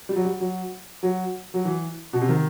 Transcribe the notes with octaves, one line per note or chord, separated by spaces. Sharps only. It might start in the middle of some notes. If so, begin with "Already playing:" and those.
G3
F#3
G3
F#3
F#3
F#3
E3
B2
C3
D#3